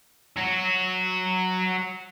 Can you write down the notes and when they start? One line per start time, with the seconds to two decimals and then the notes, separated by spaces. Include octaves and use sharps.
0.37 F#3 F#4